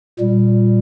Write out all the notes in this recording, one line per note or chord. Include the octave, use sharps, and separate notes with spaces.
A#2 G3